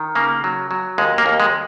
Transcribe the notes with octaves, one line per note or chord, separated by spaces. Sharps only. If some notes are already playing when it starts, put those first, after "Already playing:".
Already playing: D#3
C#3 A#3
F#3
F#3
D#2 G#3
A#3
D#2
G#3